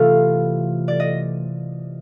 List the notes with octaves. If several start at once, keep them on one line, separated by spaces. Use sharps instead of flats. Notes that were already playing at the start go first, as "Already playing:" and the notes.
Already playing: C3 E3 A3 F4 F5
D5
D#5